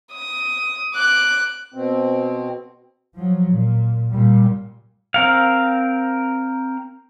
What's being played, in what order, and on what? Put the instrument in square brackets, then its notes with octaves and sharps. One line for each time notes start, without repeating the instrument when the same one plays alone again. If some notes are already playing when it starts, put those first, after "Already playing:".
[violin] D#6
D6 F#6
[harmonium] B2 C4
[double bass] F3 F#3
A#2
A#2 G3
[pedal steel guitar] C4 A#4 F5